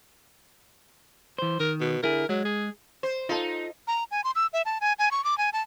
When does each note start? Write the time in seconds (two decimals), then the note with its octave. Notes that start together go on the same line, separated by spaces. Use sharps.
1.38 E3 C5
1.60 D#3 A#4
1.80 B2
2.03 D3 E4 G#4 A#4
2.29 F#3 G#3
2.45 G#4
3.03 C5
3.29 D#4 F4 A4
3.87 A#5
4.11 G#5
4.24 C6
4.35 E6
4.53 E5
4.65 A5
4.81 G#5
4.99 G#5
5.11 C#6
5.24 D6
5.38 G#5
5.53 A5